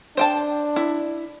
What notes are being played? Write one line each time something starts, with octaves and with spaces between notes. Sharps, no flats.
D4 C5 G5 A5
E4